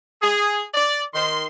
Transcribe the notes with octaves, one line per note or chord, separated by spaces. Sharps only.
G#4
D5
D#3 C6